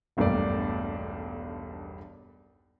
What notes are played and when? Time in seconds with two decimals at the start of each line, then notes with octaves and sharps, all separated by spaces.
0.17 E1 B1 G2 A3 A#3 D5